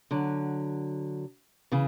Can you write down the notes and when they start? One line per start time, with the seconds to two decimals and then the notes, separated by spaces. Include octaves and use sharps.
0.11 D3 F#3
1.72 C#3 E3